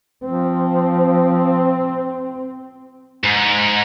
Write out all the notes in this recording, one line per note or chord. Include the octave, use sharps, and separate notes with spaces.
F3 C4
G#2